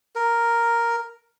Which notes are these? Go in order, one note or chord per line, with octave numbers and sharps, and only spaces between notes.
A#4